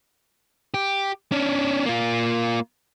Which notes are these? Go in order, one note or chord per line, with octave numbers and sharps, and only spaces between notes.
G4
C#4 D4
A#3 F4